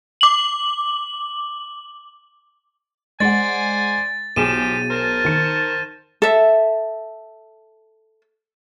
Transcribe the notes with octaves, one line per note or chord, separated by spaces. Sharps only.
D6 F#7
G#3 C5 D5 F#5 G#5 A6
B1 F3 G4 G#4 D#7 E7
A#4 C5 A5
D#3 C#7
A4 E5